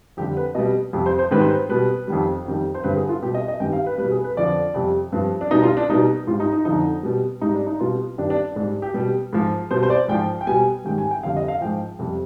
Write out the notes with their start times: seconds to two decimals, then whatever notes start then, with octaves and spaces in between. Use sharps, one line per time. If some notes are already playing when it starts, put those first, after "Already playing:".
0.17 F2 D3 G3 G4
0.37 B4
0.55 B2 G3 D#5
0.93 F2 C3 G3
1.06 C5
1.19 C5
1.31 G#2 D#3 G3 B4
1.41 C5
1.49 B4
1.69 B2 G3 B4
2.08 F2 D#3 G3
2.45 F2 D#3 G3
2.74 C5
2.84 G2 D3 G3 B4
2.96 G#4
3.09 F4
3.22 B2 G3 G4
3.35 D#5
3.48 D#5
3.60 G2 D#3 G3 G5
3.73 F5
3.86 B4
3.98 G3 B4
4.02 B2
4.11 G#4
4.24 B4
4.36 F2 D3 F3 D5
4.74 F2 C3 G3
5.12 G2 F3
5.41 D4
5.51 B2 G3 D#4
5.63 F4
5.77 D4
5.89 B2 G3 D#4
6.27 G#2 F4
6.30 G3
6.40 D#4
6.53 D#4
6.65 F2 D3 F3 D#4
7.03 B2 G3
7.41 G#2 G3 D#4
7.55 D4
7.67 D#4
7.80 B2 G3 F4
8.18 G2 D#3 G3 D4
8.30 D4
8.56 G#2 G3 D4
8.82 G4
8.94 B2 G3
9.33 G#2 F3
9.71 B2 G3 C5
9.83 C5
9.90 D5
10.08 G#2 F3 G5
10.41 G5
10.47 B2 G3 G#5
10.85 G#2 D#3 G3 G5
10.98 G#5
11.11 G5
11.23 F2 D3 G3 F5
11.37 D#5
11.48 F5
11.61 G#2 F3 G5
11.99 F2 C3 G3